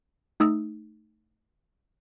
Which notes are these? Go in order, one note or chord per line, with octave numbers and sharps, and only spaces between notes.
A3 D#4 D#6 E6